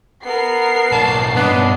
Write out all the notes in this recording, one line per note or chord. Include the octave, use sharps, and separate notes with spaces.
B3 A#4 C7
B1 D4 A5
G2 B3 C#4 D4 D#5